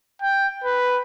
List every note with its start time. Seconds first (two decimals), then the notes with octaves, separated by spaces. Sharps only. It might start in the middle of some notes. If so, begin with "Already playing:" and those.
0.22 G5
0.64 B4